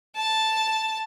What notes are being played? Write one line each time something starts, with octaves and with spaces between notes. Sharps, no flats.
A5